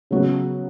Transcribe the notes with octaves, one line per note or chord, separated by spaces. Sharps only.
C#3 F#3 B3 F#4